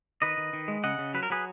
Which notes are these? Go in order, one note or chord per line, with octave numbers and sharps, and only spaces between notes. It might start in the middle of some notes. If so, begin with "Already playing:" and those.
D#3 B4 D#5
D#3
D#3
G#3
C#3 D#5 F#5
C#3
F#3 B4
A#4
F#3 G#4 B4